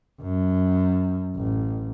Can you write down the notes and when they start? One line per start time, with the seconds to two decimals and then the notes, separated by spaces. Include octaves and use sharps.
0.21 F#2
1.36 A1